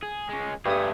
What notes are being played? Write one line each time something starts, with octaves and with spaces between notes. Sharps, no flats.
G#4
G#3 C#4
G2 A3 G#4 D#6